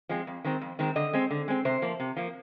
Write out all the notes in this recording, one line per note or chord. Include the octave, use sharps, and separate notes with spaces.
F3 G#3 C4
F2
D#3 G#3 C4
F2
D#3 G#3 C4
D3 D#5
G#3 C4
D3
G#3 C4
C3 C5
F3 A#3
C3
F3 A#3